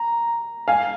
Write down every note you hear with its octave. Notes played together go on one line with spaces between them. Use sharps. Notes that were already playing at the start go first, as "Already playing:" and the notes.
Already playing: A#5
F5 G#5